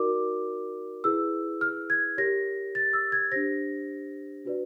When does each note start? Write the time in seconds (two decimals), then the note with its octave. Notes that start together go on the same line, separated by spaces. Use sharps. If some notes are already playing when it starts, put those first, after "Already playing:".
Already playing: D#4 F#4 A#4 D5 D6
1.04 E4 G#4 B4 E6
1.61 F6
1.90 G#6
2.17 G4 A#4 C#5 A#6
2.75 A6
2.93 E6
3.12 G#6
3.32 D4 G4 C5 A#6
4.45 D4 F#4 B4 D5